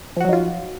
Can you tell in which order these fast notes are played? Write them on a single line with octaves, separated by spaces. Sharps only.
F3 F#4 F#3 D#4 F4